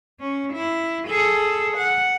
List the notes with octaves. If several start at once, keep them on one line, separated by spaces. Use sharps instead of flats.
C#4
E4
G#4 A4
F#5